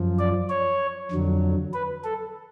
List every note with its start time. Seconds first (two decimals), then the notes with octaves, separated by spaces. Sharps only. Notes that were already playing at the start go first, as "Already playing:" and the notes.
Already playing: F#2 F3
0.19 D5
0.49 C#5
1.12 F2 D3 F#3
1.74 B4
2.04 A4